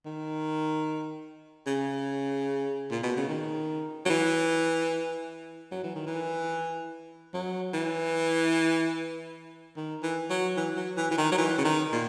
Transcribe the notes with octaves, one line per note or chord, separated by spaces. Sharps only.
D#3
C#3
A#2
B2
C#3
D#3
F#3
E3
F#3
E3
D#3
E3
F#3
E3
D#3
E3
F#3
E3
F#3
E3
E3
D#3
F#3
E3
C#3
D#3
A#2